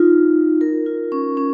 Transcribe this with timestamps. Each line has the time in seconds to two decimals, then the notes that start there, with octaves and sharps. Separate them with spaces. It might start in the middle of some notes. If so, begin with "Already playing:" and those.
Already playing: D#4 F4
0.61 A#4
0.86 F4
1.12 C#4
1.37 C#4